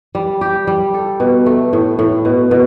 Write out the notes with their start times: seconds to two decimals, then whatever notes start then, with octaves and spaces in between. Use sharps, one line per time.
0.15 G3
0.41 G4
0.67 G3
0.94 A4
1.20 B2
1.46 A3
1.73 A2
1.99 A2
2.25 B2
2.51 B2